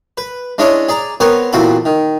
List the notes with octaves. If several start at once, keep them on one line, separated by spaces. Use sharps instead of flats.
B4
G#3 C#4 D4 E4 C#5 D#5
G#4 D5 A#5
B3 C4 A#4 B4 C#5
E2 A#2 C4 F#4 A4 B5
D#3